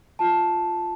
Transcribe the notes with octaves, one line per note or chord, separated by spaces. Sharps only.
F4 A5